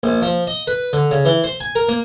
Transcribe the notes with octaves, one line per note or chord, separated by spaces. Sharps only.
A#1
F3
D#5
B4
D3
C#3
E3
C5
G#5
A#4
A#3